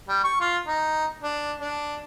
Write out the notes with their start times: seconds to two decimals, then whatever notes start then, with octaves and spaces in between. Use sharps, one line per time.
0.08 G3
0.24 C#6
0.40 F4
0.67 D#4
1.23 D4
1.60 D4